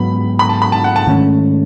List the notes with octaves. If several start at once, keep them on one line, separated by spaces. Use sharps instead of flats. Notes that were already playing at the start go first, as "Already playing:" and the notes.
Already playing: G#2 F#3 B3 B5
B5
A5
B5
A5
F#5
A5
G#2 D#3 A3 C#4